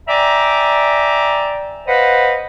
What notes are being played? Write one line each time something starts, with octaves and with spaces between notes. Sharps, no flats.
D5 E5 G5 G#5 A#5
B4 C5 D#5 F5 F#5 B5